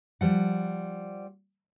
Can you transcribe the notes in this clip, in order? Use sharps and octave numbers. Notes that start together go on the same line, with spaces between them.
F3 G3 F#5